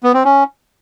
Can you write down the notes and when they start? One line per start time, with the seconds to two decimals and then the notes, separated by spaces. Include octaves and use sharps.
0.03 B3
0.14 C4
0.24 C#4